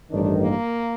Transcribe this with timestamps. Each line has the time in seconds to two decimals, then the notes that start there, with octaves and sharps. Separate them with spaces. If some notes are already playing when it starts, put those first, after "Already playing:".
0.11 A1 G2 D#3 D4
0.41 A#3